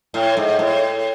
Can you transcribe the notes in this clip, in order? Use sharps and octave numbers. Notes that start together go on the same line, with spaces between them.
A2
G#2
A2